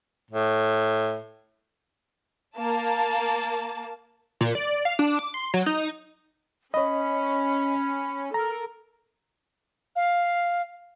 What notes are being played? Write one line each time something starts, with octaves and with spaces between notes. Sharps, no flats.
A2
A#3 A5
A#2
D5
F5
D4
D6
C6
F#3
D#4
C#4 C#5 D#5 B5
A4 A#4 A#5
F5